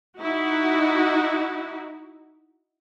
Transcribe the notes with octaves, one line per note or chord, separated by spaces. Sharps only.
D#4 E4 F#4